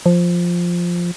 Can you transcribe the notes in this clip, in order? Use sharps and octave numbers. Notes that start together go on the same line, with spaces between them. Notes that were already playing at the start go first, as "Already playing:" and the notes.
F3